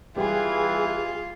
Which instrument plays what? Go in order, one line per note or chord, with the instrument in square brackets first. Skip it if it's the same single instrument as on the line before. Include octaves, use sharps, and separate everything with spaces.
[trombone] E3 [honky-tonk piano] G3 G4 [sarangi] F4 [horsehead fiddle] G#4